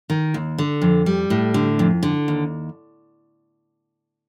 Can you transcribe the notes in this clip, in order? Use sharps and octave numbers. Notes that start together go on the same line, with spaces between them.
D#3
D#2
D3
F2
G3
A2
D3
F2
D3
D#2